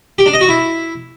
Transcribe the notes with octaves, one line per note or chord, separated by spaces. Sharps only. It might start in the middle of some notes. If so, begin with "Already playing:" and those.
G4
D4
D#5
F#4
E4